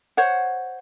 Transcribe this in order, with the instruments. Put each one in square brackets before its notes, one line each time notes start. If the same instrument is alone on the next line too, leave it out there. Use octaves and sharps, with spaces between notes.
[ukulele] C5 C#5 F#5